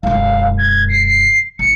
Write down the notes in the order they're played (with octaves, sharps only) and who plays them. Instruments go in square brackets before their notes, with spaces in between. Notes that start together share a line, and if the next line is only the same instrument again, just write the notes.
[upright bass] E1 F#2 [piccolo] F5
[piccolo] G#6
C7
[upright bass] A1 [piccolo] C#7